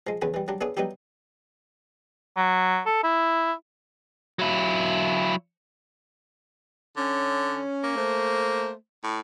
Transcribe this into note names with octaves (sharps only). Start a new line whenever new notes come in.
F3 G#3
E2 C#3 F#4 G#5 B5
E3 G3
F#3 G3 D4
B3 D4 E4 F#4 G#4 C#5
F#3 G3 B3 D#4 E4 G4
F#3
A4
E4
F#3 E4
D3 C#4
A#3
A3 C5
A2